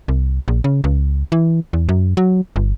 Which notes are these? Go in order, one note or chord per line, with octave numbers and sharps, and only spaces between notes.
C2
A#1
C#3
C#2
E3
E2
F#2
F#3
G1